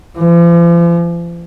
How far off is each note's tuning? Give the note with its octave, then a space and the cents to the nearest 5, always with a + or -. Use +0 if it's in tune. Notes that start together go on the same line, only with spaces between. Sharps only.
F3 -45